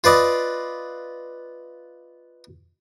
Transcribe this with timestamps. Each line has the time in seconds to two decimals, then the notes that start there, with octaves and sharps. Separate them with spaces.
0.04 F4 B4 D5 D#5